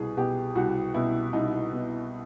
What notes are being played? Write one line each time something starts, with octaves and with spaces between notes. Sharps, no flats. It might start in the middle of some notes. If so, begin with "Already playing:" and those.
Already playing: C2 B2 G#4
B2 G4
C2 F#4
B2 E4
C2 D#4
B2